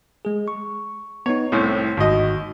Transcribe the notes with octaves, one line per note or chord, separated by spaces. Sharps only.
G#3 G#4
C#6
B3 D#4 C#5
C2 A2 C4 C#5
G#1 D#2 G#2 F#4 D#5